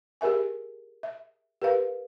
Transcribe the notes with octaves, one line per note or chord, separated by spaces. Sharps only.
G4 G#4 A#4 E5 G#5
E5
G4 A#4 B4 F5